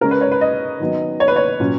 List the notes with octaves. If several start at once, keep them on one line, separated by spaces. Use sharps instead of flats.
C#3 G#3 C#4 A#4
B4
C#5
B4
D#5
D#3 F#3 B3
C#5
B4
C#5
A#2 F#3 C#4